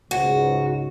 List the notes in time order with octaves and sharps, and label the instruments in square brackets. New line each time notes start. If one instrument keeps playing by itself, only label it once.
[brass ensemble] C#2 G#2 [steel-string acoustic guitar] F#4